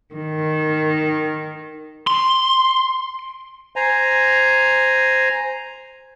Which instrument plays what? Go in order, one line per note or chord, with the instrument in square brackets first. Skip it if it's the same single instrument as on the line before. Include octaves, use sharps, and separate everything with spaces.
[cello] D#3
[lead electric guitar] C6
[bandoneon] C5 G#5 A#5